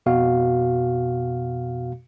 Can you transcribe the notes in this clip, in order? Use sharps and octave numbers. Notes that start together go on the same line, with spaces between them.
F2 B2 F#4 F5